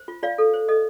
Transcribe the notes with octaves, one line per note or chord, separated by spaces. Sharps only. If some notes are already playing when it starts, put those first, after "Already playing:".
Already playing: C5
F4
F4 D5 F5
A4
C5
A4 D#5